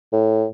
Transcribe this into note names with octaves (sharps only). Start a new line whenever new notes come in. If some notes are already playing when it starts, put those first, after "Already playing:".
A2